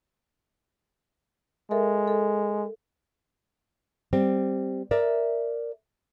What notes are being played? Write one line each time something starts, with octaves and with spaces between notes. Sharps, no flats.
G#3 A4 A#4 E5
A4
G3 C4
A#4 D5 E5